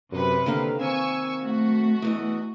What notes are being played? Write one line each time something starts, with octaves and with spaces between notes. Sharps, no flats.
F#2 C3 B4
D3 D#3 A#3 F5
C4 G#5 C#6 E6
A3 F#4
E2 E3 D#5